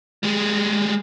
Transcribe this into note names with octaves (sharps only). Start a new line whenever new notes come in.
G3 G#3